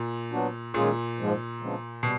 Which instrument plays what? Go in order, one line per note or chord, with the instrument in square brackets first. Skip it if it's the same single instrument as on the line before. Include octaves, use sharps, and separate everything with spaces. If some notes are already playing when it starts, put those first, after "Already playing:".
Already playing: [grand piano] A#2
[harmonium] F#3 B3 D4 F#4
[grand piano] A#2 [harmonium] D#3 G#3 C#4 F4 G#4
[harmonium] G#2 F3 G#3
C#3 F3 G#3 B3 D4
[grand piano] B2 [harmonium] G3